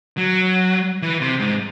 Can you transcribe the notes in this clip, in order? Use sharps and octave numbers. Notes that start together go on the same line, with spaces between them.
F#3
E3
C3
G#2